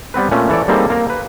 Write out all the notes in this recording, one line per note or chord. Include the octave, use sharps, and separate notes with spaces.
G3 B3 C4 B4
A#2 A3 C#4
E3 A4 C#5 D5
G3 A#3 C4 D#4 G#4 A4
A#3 A#5
B4